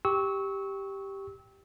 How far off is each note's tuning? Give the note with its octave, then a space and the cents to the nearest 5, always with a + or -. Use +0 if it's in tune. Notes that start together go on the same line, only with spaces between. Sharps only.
G4 +0 C#6 +0 E6 -30